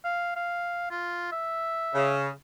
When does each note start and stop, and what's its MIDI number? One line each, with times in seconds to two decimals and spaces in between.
0.05 0.35 77
0.36 0.89 77
0.91 1.27 65
1.32 2.14 76
1.95 2.28 49